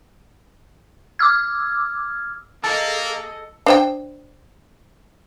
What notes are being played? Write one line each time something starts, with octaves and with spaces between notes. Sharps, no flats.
D6 E6 F6 G#6
A#3 G#4 A4 D#5 A5 E6 C#7
D4 C5 G5